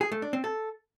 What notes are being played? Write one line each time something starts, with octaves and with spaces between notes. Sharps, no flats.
G#4
A3
D4
C4
A4